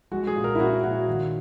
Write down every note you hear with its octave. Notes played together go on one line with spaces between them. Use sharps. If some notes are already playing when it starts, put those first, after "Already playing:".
G#3 F#4
G#4
A#2
A#4
E4
C#4 F#4
A#2 F#4
D#3